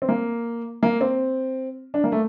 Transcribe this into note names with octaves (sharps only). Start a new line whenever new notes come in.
C4
A#3
A#3
C4
D4
A#3
A3